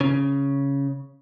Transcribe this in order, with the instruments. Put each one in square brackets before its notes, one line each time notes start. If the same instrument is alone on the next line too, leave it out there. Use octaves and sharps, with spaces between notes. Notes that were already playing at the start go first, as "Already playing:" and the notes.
[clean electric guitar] C#3